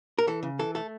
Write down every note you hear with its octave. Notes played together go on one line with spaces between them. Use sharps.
A#4
E3 A4
C#3
E3 A4
A3 A4